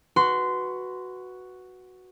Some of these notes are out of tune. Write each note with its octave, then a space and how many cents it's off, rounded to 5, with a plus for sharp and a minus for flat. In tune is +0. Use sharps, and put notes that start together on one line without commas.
F#4 +0 B4 +0 C6 -20